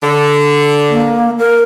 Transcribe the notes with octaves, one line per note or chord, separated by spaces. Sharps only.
D3
A#3
A#4